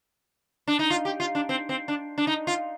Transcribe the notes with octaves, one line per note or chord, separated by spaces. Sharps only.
D4
D#4
F4
G4
F4
D4
C4
C4
D4
D4
D#4
F4